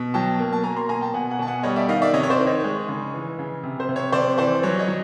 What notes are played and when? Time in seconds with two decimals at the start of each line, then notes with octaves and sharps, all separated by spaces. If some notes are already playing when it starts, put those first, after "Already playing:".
Already playing: B2
0.14 F#3 G5 A5
0.39 A#3
0.53 A5
0.63 A#3 G#5 A#5
0.76 A#5 C6
0.89 B2 G#5 A#5
1.01 G5 A5
1.14 B2 F#5 G#5
1.30 F#5 G#5
1.39 B2 A5
1.47 F#5 G#5
1.63 G3 C#5 D#5
1.76 D5 E5
1.88 D#3 D#5 F5
2.02 D5 E5
2.13 C3 C#5 D#5
2.23 C#5
2.30 C5 D5
2.39 D#3
2.47 C#5 D#5
2.64 G#3
2.88 C#3
3.14 E3
3.39 C#3
3.63 C3
3.80 C5
3.89 C3
3.96 C#5
4.12 C3 C5 D5
4.38 E3 C5 D5
4.63 F#3 C#5
4.79 C#5 D#5
4.88 F#3